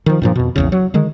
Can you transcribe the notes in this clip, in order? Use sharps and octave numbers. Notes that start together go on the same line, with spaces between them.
D#3 F3
G2 A#2 F3
F2 B2
A#1 E2 C#3
F#3
D3 D#3 G#3